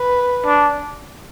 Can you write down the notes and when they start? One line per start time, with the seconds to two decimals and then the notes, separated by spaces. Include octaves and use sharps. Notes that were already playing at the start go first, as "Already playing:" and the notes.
Already playing: B4
0.46 D4